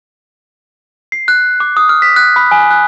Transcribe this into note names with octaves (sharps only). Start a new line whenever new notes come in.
C7
F#6
D6
D#6
F6
B6
F#6
B5
G#5
F#6